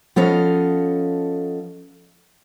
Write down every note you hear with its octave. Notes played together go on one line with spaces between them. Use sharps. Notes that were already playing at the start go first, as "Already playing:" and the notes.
F3 B3 C#4 A4 D#5 F5